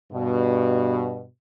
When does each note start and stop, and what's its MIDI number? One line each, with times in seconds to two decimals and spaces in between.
0.13 1.26 43
0.13 1.26 47